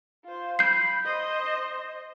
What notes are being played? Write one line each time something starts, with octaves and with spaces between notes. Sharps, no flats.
F4 C5
B5 G6 C7
C5 D#5